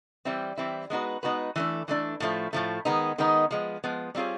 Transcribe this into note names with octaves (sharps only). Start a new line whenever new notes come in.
E3 G3 C4 E4
E3 G3 C4 E4
G#3 B3 D#4 F#4 B4
G#3 B3 D#4 F#4 B4
E3 A3 D4
E3 A3 D4
A2 F3 A3
A2 F3 A3
D#3 G#3 B3 D#4
D#3 G#3 B3 D#4
F3 G#3 B3
F3 G#3 B3
G3 C4 F4 G#4 C#5